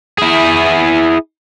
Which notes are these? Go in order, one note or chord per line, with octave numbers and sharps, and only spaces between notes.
E4 G#4